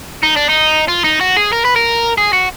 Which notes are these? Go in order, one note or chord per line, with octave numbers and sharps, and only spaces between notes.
D#4
D4
D#4
F4
D#4
F#4
G#4
A#4
B4
A#4
G#4
F#4